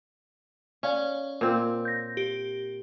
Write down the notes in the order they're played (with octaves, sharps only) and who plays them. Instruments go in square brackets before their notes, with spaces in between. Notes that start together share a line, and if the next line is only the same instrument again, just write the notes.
[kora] C#4 [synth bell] C#5 D5 F5
[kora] A#2 C4
[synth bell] G6 A#6
G4